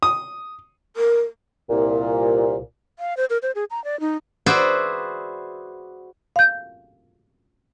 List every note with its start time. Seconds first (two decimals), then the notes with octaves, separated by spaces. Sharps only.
0.03 D#6
0.96 A#4
1.70 C2 A#2
2.99 F5
3.17 C5
3.30 A#4
3.42 C5
3.55 G#4
3.70 A#5
3.84 D5
4.00 D#4
4.46 F#4 G#4 B4 C5 D5 E5
6.36 F5 G6